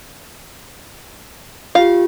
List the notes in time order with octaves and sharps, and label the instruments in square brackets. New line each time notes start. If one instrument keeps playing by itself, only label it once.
[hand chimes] F4 G4 [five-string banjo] F5